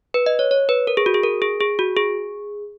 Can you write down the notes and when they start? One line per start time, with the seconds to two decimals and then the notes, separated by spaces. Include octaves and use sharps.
0.14 B4
0.26 D#5
0.39 C#5
0.51 C#5
0.69 B4
0.87 A#4
0.97 G#4
1.06 F#4
1.14 G#4
1.23 A#4
1.42 G#4
1.60 G#4
1.79 F#4
1.97 G#4